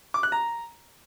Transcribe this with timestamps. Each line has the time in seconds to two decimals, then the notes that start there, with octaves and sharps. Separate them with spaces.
0.14 D6
0.23 F#6
0.32 A#5